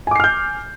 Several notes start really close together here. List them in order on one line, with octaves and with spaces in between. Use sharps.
G#5 D6 C7 F6 G6